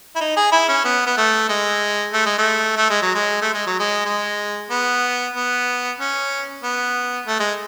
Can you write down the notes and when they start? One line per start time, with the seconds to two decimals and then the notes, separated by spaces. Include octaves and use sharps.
0.16 E4
0.20 D#4
0.37 G#4
0.52 E4
0.68 C#4
0.84 B3
1.06 B3
1.17 A3
1.49 G#3
2.13 A3
2.26 G#3
2.38 A3
2.77 A3
2.90 G#3
3.02 F#3
3.15 G#3
3.41 A3
3.54 G#3
3.66 F#3
3.79 G#3
4.05 G#3
4.70 B3
5.33 B3
5.98 C#4
6.62 B3
7.26 A3
7.39 G#3